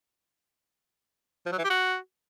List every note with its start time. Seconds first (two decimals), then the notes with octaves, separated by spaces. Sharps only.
1.46 F3
1.52 F#3
1.58 E3
1.64 G4
1.70 F#4